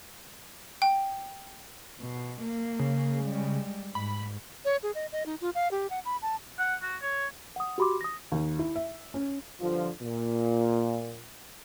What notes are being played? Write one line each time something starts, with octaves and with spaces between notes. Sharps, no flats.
G5
B2
A#3
C#3
G3 G#3
G#2 B5
C#5
G#4
D#5
D#5
D#4
F4
F5
G4
F#5
B5
A5
F#5
F#4
C#5
F#5 D#6
F#4 G4 B5 C6 D6
D#6 A#6
D#2
E4
E5
C#4
G2 D3 F3
A#2